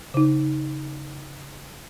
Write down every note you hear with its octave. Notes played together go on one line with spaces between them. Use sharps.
C#3 D#4